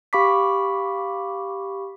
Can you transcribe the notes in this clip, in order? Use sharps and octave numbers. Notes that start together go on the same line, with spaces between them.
G4 F5 B5 C#6 D6 B6